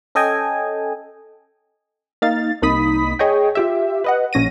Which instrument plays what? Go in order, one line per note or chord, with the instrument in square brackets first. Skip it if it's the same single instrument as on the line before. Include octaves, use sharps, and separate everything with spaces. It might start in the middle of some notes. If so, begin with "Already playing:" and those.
[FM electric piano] C#4 A4 D#5 G5 G#5
[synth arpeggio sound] A#3 D#4 F5 A6
C2 A#3 D#4 B5 D#6 B6
G#4 C#5 D#5 G5
F4 G4 E5
B4 D#5 F#5
A#1 C#4 A#6 D#7